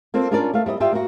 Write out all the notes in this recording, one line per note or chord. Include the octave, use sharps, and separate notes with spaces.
A#3 C4 F4 A4
C#4 D4 F4 A#4 B4 D5
A3 F5
G3 E4 D5 D#5
F4 G4 D5 E5 F5 G5
A#3 F#4